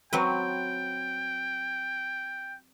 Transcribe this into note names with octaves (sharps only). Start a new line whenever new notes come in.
F#3 C4 B4 G5